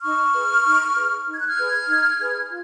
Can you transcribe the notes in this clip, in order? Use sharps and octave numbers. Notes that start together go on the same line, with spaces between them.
D#4 C#6 F6
G#4 B4
D#4
G#4 B4
D#4
G#6
F#6
F6 G#6
G#4 B4
D#4
G#4 B4
F4